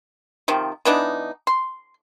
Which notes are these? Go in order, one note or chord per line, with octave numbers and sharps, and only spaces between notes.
C3 D#3 F3
E3 B3 D4 D#4
C6